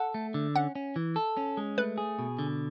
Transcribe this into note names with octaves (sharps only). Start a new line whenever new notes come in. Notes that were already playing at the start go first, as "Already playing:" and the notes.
Already playing: A4 F#5
A3
D3
C#4 F#5
C#4
E3
A4
C#4
G#3
A3 B4
G#4
B2
D3